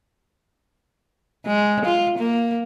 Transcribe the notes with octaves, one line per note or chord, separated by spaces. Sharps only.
G#3
F4
A#3